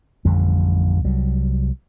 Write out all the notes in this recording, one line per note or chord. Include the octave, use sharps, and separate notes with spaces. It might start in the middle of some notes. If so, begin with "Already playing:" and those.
A1 F2 D3 G3
C2 F#3 G3